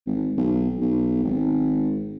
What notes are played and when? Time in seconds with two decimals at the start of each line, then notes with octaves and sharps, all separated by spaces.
0.06 G#1
0.38 B1
0.81 B1
1.23 G#1